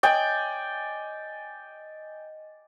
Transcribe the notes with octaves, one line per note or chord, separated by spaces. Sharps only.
D5 D#5 G5 G#5